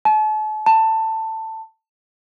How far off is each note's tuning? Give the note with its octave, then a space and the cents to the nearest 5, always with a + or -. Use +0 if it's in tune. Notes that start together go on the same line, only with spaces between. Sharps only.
A5 -40
A5 +15